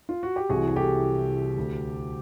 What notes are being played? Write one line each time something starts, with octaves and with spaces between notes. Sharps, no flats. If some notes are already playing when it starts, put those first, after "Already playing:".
F4
F#4
G4
C2 C3 E3 F#4 G#4
G#4
G4 A4
D2 D3